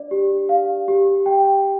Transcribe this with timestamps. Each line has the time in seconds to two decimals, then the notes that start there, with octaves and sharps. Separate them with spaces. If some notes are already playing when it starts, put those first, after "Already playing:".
Already playing: D4 D5
0.11 G4
0.49 F5
0.88 G4
1.26 G5